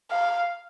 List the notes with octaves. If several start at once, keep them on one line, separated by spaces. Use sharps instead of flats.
F5